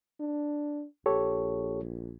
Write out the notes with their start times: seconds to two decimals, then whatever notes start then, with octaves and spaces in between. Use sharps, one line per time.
0.20 D4
1.06 A#1 G4 A4 C#5